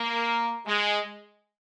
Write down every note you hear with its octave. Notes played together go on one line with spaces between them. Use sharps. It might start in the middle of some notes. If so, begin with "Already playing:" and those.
Already playing: A#3
G#3